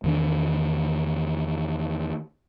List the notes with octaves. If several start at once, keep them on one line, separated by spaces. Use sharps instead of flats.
E2 D#3 D4